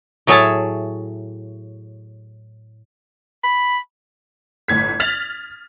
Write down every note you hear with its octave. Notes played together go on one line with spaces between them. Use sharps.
A2 F#3 G#4 C#5 E5 A5
B5
G1 A2 G#6 B6
F6 A6 B6 F7 F#7